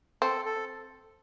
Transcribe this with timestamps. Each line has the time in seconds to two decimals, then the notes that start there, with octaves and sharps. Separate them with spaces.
0.22 C4 A4
0.45 A4